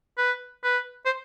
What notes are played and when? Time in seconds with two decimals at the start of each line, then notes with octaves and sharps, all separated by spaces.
0.17 B4
0.64 B4
1.05 C5